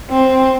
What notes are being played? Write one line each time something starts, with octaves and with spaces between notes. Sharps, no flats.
C4